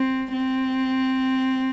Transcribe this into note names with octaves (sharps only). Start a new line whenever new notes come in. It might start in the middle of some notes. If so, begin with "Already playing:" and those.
Already playing: C4
C4